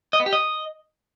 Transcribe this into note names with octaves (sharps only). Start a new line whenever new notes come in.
D#5
B3
G4
D#5